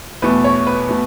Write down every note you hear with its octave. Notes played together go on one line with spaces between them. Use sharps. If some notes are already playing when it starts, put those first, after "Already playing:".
E2 B2 A3 B4
C#5
B4
B2 A3